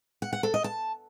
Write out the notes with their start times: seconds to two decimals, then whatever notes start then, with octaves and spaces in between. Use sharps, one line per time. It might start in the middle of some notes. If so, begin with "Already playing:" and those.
0.22 F#5
0.33 F#5
0.43 A4
0.54 D#5
0.64 A5